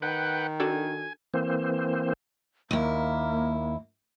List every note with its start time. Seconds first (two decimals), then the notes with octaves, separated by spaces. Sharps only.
0.02 D#3 B4 F#5 G5
0.60 D4 F#4 A4 G#5
1.34 E3 A#3 C4 C5
2.71 D#2 A#3 E4